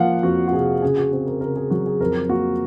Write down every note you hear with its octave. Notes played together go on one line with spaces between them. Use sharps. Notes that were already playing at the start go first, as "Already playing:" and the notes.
Already playing: F3 A#3 F5 F#5
F2 F#4
F#4
C3 G#4
C#3 G#4
F#4
C4 G#4
A#4
C#3 A#4
G#4
F#3 F#4
G#4
F2 A#4
A#3 F#4